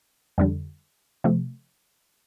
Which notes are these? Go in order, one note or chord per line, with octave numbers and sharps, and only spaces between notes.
F2 D3 G3
C3 F3 A3